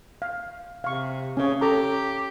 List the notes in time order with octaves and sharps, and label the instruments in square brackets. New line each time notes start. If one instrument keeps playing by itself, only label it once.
[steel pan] F5
[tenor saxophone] C3 [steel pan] F5 C#6
[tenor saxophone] C#3 [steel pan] C#4 C#5
[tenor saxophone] G4 [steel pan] A4 A#5